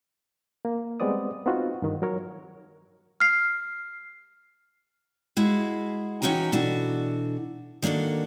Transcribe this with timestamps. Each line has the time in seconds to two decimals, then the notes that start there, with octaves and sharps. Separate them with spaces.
0.65 A#3
1.00 G3 G#3 B3 C4 D5 D#6
1.46 B3 C4 D#4 F4 F#4
1.82 G2 D#3
2.02 F#3 A#4 C#5
3.20 F6 C7
5.37 G#3 E4 F#4 G#4 F5
6.22 E3 C#4 D#4 F#4 G5 A#5
6.52 B2 E3 D4 F#4 A4
7.82 D#3 A#3 D4 F#4 A4